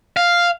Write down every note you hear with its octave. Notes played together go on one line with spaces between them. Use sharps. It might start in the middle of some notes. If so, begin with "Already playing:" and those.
F5